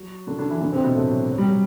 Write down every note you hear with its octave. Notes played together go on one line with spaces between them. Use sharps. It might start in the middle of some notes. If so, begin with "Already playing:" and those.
Already playing: F#3 F#4
D3 D4
D3 D4
E3 E4
D3 D4
C3 C4
B2 B3
A2 A3
F#3
F#3
G3
F#3